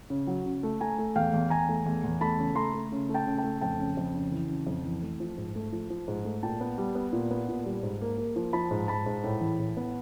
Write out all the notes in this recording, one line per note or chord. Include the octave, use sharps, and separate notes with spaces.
C#3
F#3
C#3
A3
A3 G#5 A#5
A3
E2 F5 G5
E2
E2 G#5 A#5
A3
E2
E2
A3 A5 B5
C#3
A3 A#5 C6
A3
C#3
A3
G5 A5
C#3
G5 A5
A3
F2 G5 A5
C#3
F2
C#3
E3
C#3
F2
E3
A3
F3
G#2
A3
F3
F3
G#2
A3
A#2 G5 A5
B3
G3
B3
A#2
B3
A#2
G3
G#2
A#3
A#3
F3
F3 A5 B5
G#2
G#2 A5 B5
G#2
A2
E3
A2
B3